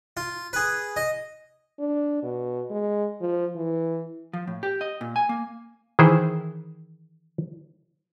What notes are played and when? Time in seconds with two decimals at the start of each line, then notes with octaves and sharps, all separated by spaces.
0.17 F4
0.53 G#4 B4
0.96 D#5
1.79 D4
2.23 B2
2.71 G#3
3.21 F3
3.56 E3
4.33 F3
4.47 A2
4.63 G4
4.81 D#5
5.01 A#2
5.16 G#5
5.29 A#3
5.99 D#3 E3 E4 G#4 C5